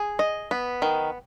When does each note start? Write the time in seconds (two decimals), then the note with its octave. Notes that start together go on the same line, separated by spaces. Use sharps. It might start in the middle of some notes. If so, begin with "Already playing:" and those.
Already playing: G#4
0.19 D#5
0.51 B3
0.82 D#3